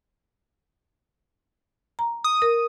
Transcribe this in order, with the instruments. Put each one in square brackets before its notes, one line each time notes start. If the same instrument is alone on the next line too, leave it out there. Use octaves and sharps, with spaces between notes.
[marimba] A#5
[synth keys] D#6
[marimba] A#4